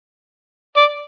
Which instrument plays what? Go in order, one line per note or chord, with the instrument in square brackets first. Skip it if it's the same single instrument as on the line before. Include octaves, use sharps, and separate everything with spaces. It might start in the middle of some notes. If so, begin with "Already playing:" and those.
[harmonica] D5